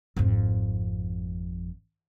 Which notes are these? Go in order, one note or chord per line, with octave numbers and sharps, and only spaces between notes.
G#1 F2